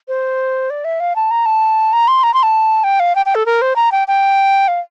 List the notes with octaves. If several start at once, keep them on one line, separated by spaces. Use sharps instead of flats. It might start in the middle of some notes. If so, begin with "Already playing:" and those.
C5
D5
E5
F5
A5
A#5
A5
A#5
C6
A#5
C6
A5
G5
F5
G5
G5
A4
A#4
C5
A#5
G5
G5
F5